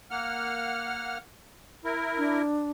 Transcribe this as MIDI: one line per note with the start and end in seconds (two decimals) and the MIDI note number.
0.11 1.18 58
0.11 1.18 78
0.11 1.18 89
1.84 2.42 64
1.84 2.42 70
2.18 2.71 62